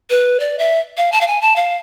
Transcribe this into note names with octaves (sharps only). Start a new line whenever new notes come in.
B4
D5
E5
F5
A5
F5
G#5
A5
F5